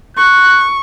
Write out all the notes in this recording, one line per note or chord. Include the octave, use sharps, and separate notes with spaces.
C#6 F#6